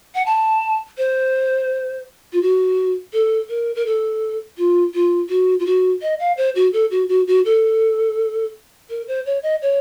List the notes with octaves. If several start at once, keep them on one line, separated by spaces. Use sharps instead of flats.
F#5
A5
C5
F4
F#4
A4
A#4
A#4
A4
F4
F4
F#4
F4
F#4
D#5
F5
C5
F#4
A4
F#4
F#4
F#4
A4
A#4
C5
C#5
D#5
C#5